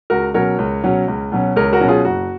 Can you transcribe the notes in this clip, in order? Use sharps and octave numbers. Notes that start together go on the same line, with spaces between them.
C#2 F#4 A#4
B2 F#3 C#4 A#4 C#5
C#2
B2 F#3 C#4
C#2
B2 F#3 C#4
C#2 A#4 C#5
F#4 A#4
B2 F#3 C#4
F4 G#4
F#1 F#4